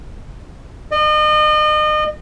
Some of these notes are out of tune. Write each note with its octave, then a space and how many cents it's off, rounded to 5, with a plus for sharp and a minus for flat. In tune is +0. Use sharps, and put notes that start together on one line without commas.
D#5 -35